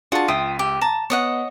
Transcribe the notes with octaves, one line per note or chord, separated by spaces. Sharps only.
D4 F4 F#4 G#4 A5
C#2 F4 E5 G5 D#6 D#7
G4
A5 A#5 E7
B3 C#5 D#5 F#5